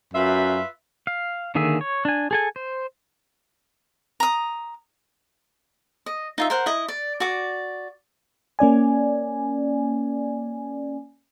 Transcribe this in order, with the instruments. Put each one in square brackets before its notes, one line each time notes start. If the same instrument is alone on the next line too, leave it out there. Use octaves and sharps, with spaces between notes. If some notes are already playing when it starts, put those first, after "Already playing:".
[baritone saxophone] F#2 [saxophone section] F4 B4 E5
[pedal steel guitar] F5
D3 D#3 A#3 G#4 E5
C#5
D4 G#5
G#4 A4 G#5
C5
[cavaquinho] A#5 D#6
D#5
D#4 F4 E5
A#4 C5 F#5
E4 D#5
D5
F#4 D5 D6
[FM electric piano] A#3 C#4 D5 G#5